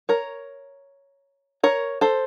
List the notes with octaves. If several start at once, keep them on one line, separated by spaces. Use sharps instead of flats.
A#4 C#5
A#4 C#5
A4 C5